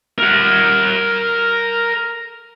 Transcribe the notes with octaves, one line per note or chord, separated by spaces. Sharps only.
A#4 F#5